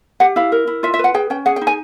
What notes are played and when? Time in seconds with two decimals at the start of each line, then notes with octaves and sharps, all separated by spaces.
0.20 G4 F#5
0.36 E4 F5
0.52 A#4
0.67 E4
0.83 F4 E5
0.94 E5
0.99 B4 F#5
1.14 G#4 G5
1.30 C#4 G5
1.46 G#4 F#5
1.56 G5
1.61 D#4
1.67 G#5